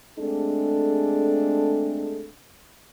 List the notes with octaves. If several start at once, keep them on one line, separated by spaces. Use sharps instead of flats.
G#3 A3 C4 D4 G#4 A4